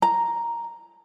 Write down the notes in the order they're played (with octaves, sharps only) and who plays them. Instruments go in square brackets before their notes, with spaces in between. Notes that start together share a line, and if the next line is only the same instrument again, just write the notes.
[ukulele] A#5